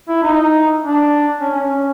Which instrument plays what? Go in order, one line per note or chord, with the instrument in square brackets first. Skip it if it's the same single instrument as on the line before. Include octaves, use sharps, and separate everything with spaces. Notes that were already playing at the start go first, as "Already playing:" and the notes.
[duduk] E4
D#4
D4
C#4
C#4